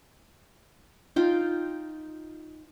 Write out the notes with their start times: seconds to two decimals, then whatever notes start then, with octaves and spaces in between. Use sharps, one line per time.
1.16 D#4 F4 G5